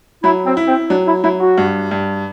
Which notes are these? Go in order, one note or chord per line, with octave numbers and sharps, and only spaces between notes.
F#3 E4
C4
E4
C4
F#3 D4
E4
F#3 E4
F#4
G2
G2